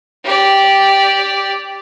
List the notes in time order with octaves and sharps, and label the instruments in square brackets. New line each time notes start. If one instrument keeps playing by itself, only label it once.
[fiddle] G4 D5